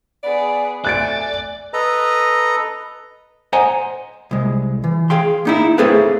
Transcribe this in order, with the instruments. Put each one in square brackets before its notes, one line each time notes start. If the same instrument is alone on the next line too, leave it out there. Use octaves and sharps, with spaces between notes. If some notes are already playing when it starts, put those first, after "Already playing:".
[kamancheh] B3 G#4 [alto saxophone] D5
[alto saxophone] A3 [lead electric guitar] D5 [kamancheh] G#5 [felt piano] F#6 A6 D7
[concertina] A4 B4 D#5 A#5
[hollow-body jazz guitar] C5 D#5 F#5 G#5 A#5
C2 G#3
E3
G#4 F5 G5 C6
A#3 D#4 E4
A3 C4 G#4 A4 B4 F5